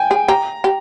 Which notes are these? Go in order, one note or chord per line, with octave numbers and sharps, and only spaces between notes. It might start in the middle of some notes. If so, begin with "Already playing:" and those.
Already playing: G5 G#5
G#4
G4 A#5
G4